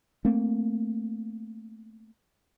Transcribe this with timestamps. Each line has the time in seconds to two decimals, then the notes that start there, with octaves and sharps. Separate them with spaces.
0.25 A3 A#3 C4